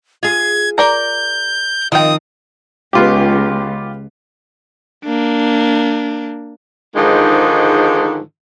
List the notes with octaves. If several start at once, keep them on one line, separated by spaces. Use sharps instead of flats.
F4 G#4 G#6
A#4 D5 A#5 G6
D#3 F3 C4 F4 G5 D#6
C#2 B3 F4 G4
A#3 D4
G#2 D3 D#3 F3 G#3 D#4